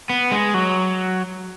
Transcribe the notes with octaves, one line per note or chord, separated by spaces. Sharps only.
B3
G#3
F#3